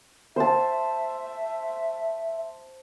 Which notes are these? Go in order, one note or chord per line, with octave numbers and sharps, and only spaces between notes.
C5 E5 A5